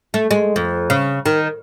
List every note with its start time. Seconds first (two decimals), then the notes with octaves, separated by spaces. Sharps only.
0.14 A3
0.31 G#3
0.56 F2
0.90 C#3
1.26 D#3